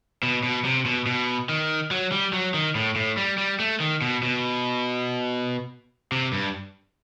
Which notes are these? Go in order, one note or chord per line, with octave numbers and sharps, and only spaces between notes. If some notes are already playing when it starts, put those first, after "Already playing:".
B2
B2
C3
B2
B2
D#3
F#3
G3
F#3
D#3
A2
A2
G3
G3
A3
D#3
B2
B2
C3
G2